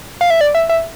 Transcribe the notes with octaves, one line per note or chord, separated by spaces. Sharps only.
F5
E5
D5
E5
E5